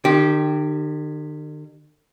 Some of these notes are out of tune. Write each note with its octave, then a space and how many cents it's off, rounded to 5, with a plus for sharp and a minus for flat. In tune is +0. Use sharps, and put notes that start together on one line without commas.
D#3 -45 G4 -10